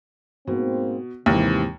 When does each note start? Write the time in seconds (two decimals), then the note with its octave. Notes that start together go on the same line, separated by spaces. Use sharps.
0.47 G#2 B2 A#3 C4
1.26 D#2 G#2 C3 E3